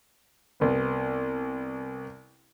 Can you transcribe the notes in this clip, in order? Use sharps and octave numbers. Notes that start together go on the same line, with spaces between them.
C2 B3